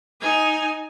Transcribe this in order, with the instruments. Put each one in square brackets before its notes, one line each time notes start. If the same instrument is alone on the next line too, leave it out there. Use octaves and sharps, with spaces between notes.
[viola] D#4 G#5